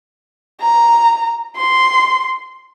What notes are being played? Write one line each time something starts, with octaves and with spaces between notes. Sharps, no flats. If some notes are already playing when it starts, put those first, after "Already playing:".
A#5
C6